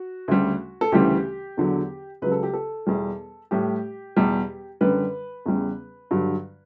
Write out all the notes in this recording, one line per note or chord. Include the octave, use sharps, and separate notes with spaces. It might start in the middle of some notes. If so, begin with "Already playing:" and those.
Already playing: F#4
D2 C#3 G3
A4
D2 C#3 E3 G3 G4
E2 D3 F#3
C#2 C#3 F#3 B4
A4
G4
A4
E2 B2 G3
A2 G3 G4
E2 B2 G3
F#2 D3 G3 B4
E2 C#3 G3
G2 D3 F#3